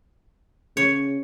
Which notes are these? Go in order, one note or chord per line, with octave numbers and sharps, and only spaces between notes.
C#3 C#5